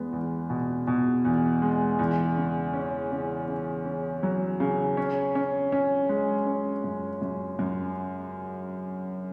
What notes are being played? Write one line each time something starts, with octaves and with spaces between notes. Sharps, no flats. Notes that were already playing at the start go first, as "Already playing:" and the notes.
Already playing: E2 G#3 B3
E2
B2
B2
E2
G#3
E2
C#3
C#4
C#3
C#3
C#4
F#3
C#3
C#4
C#4
C#4
G#3
C#4
F#2
F#2
F#2